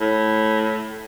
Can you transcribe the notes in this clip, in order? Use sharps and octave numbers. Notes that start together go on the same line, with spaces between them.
A2